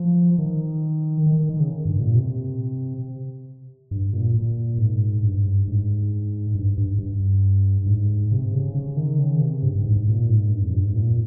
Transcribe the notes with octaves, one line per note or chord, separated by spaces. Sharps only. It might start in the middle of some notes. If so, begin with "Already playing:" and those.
Already playing: F3
D#3
D#3
D#3
C#3
G2
A#2
C3
G2
A#2
A#2
G#2
G2
G#2
G2
G2
G2
G#2
C3
C#3
C#3
D#3
C#3
C3
G2
G2
G#2
A#2
G#2
G2
F2
G2
G#2
A#2